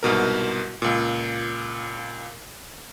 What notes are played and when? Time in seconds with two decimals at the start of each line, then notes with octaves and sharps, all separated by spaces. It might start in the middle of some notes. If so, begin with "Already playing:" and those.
0.03 C2 G#2 B2 A#4
0.82 C#2 A#2